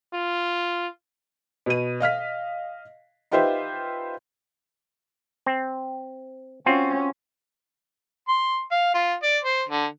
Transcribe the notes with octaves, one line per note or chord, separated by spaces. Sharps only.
F4
B2 D#7
D#5 F5 F6 B6
D#4 F4 G4 B4 C5 E5
C4
C4 C#4 F4 F#4
C6
F5
F4
D5
C5
D3